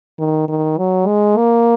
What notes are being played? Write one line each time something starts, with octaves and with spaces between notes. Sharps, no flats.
D#3
D#3
F#3
G#3
A#3